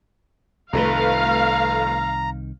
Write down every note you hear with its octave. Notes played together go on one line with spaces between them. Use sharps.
C2 F2 D#3 A3 B4 F5 A#5